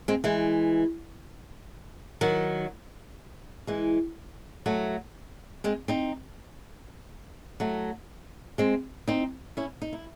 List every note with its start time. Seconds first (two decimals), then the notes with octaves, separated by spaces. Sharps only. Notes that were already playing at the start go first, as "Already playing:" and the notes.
0.08 G#3 C4
0.24 E3 G#3
2.21 D#3 F#3
3.67 E3 G#3
4.66 F#3 A3
5.64 G#3 C4
5.88 C4 D#4
7.60 F#3 A3
8.58 G#3 C4
9.08 C4 D#4
9.57 C#4 E4
9.82 D#4
9.93 E4